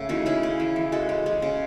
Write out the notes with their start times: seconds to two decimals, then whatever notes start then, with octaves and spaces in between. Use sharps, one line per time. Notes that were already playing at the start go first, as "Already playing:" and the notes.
Already playing: C#3 A3
0.09 E3 D#4 F#4
0.26 C#3 E4 G#4
0.43 C#3
0.60 E3
0.76 E3
0.92 G#3 F#4 A4
1.09 G#3
1.26 G#3
1.42 C#3